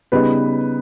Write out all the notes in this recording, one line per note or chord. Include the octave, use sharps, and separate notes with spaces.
C#3 G3 B3 D#4 B4